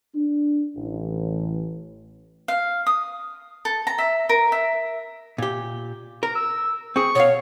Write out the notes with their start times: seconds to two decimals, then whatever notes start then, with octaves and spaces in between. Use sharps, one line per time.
0.15 D4
0.76 A1
2.48 F5
2.86 D#6
3.65 A4
3.87 A#5
3.98 E5
4.29 A#4
4.52 E5
5.38 A#2 G4
6.23 A#4 A#5
6.35 E6
6.96 C4 G#4 C#6
7.15 B2 C#5 F5